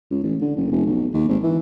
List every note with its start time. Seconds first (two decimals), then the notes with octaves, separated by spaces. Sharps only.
0.11 C#2
0.24 A1
0.41 D3
0.57 F#1
0.71 F1
0.86 B1
1.14 D#2
1.29 G#1
1.43 E3